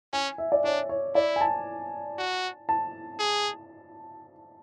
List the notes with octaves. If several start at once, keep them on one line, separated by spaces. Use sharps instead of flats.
C#4 G#5
E5
D5
D4 C#5
C#5
E4 D5
G#5
A5
F#4
A5
G#4